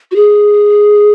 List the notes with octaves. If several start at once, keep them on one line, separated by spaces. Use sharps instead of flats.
F#4
G#4